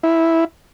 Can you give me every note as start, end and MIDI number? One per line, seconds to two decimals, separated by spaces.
0.03 0.45 64